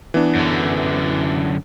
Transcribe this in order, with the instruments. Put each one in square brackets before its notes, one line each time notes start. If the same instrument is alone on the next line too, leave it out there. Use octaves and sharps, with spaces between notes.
[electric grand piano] E3 B3 D4
[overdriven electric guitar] F#2 D3